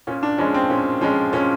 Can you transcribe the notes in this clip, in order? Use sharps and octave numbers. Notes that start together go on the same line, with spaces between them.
A#2 C#4
D4
F3 G#3 C#4
C4
A#2 C#4
F3 G#3 C#4
A#2 C#4